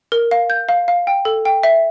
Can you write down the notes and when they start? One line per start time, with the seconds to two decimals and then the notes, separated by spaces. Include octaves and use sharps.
0.12 A#4
0.31 F5
0.50 G6
0.69 F5
0.88 F5
1.07 G5
1.25 A4
1.45 G5
1.63 E5